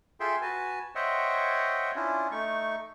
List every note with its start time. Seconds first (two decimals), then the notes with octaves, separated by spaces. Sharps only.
0.20 F4 G#4 A4 E5 G5 C6
0.42 F#4 B4 G#5 A5
0.95 C5 C#5 D#5 E5 F#5 G5
1.96 C#4 D4 E4 F4
2.32 A3 D#4 C#6